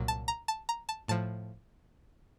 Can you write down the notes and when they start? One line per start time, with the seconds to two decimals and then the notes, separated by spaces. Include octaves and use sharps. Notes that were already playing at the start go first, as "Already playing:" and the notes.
Already playing: C2 A#2 F#3
0.08 A5
0.28 A#5
0.48 A5
0.69 A#5
0.89 A5
1.08 A2 F3 A5